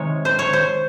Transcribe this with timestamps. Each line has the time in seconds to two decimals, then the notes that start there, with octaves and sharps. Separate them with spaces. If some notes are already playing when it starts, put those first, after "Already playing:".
Already playing: C3 D#3 G#3 C#5
0.25 C5
0.39 C#5
0.53 C5